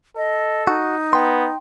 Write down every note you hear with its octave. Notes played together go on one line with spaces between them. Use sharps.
A4 D#5
D#4 F#4
B3 G5 C6